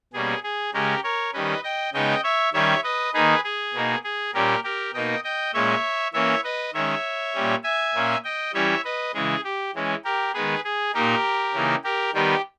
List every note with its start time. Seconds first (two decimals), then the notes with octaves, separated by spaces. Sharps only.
0.13 B2 G3 A#3 C#4 G#4
0.43 G#4
0.73 C#3 G#3 C#4 G4 A#4
1.03 A#4 C#5
1.33 D#3 G3 C#4 B4 D#5
1.63 D#5 G5
1.93 C#3 G#3 B3 D#4 D#5 G5
2.23 C#5 E5
2.53 D#3 G3 C#4 C#5 E5
2.84 B4 D#5
3.14 D#3 A#3 D#4 G#4 B4
3.44 G#4
3.74 B2 A#3 D#4
4.04 G#4
4.34 A#2 G3 C#4 G4 A#4
4.64 G4 A#4
4.94 B2 A#3 D#4 D#5 G5
5.24 D#5 G5
5.53 A#2 G#3 C#4 C#5 E5
6.13 E3 A#3 C#4 C#5 E5
6.44 B4 D#5
6.74 D#3 G#3 C#4 C#5 E5
7.34 A#2 G3 C#4
7.63 E5 G#5
7.94 A#2 A#3 C#4
8.24 D#5 G5
8.54 E3 G3 C#4 C#5 E5
8.85 B4 D#5
9.14 C#3 E3 G#3 G#4
9.44 G4
9.74 E3 G#3 C#4
10.04 G4 A#4
10.34 D#3 G#3 B3 G#4 B4
10.64 G#4
10.94 A#2 A#3 D#4 G4 A#4
11.54 C#3 E3 A#3 D#4
11.84 G4 A#4
12.14 D#3 G3 B3 D#4 G4